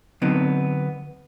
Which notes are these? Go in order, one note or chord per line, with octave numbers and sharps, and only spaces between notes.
D3 F#3 B3 C4 D#4